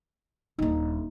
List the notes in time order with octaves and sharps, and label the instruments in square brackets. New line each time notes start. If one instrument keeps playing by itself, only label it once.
[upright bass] D#1 D4 [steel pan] A#3 D#4